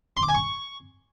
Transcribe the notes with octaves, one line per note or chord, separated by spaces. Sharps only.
C6
D6
G#5
C#6